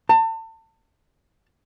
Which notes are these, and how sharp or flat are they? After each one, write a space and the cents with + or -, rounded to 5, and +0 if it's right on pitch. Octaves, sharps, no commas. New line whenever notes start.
A5 +35